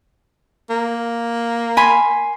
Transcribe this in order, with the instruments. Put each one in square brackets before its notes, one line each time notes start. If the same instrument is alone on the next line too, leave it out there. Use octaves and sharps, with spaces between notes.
[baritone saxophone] A#3
[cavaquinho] G#5 B5 C6